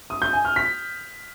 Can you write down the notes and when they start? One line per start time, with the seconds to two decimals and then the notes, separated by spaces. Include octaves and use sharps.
0.10 D#6
0.22 G6
0.33 G#5
0.45 F6
0.56 B6